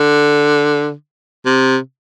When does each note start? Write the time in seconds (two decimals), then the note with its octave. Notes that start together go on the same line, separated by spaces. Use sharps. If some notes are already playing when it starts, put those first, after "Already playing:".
Already playing: D3
1.46 C3